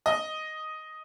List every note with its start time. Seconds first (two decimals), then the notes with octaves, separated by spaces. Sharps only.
0.06 D#5